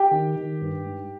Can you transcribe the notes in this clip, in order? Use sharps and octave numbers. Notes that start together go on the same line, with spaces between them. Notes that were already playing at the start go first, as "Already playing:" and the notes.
Already playing: G4 G5
D#3
D#3
G2
G#2